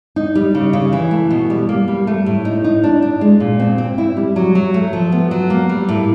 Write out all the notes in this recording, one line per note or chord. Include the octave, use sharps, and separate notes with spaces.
D#4
G3
C#3
C#3
E3
A3
B2
G3
A#3
G3
A3
A2
D#4
D#4
D4
D4
G#3
A#2
C4
C4
E4
G3
F#3
F#3
A3
F3
B3
F#3
A#3
G3
A2